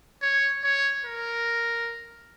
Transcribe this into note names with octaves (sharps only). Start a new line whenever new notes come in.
C#5
C#5
A#4